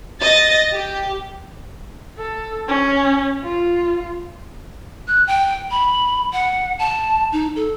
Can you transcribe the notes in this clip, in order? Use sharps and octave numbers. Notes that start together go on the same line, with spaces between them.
D#5 A6
G4
A4
C#4
F4
F#6
G5
B5
F#5
A5
D#4
A4